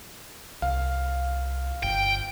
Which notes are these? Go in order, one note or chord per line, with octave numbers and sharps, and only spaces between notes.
C2 F5
G1 G5